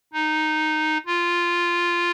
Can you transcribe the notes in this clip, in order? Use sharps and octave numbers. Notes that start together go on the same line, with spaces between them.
D#4
F4